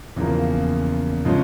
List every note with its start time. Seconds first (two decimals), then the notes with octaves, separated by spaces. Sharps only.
0.16 E2 C#3 F3 A#3
1.25 C#3 F3 G#3 C#4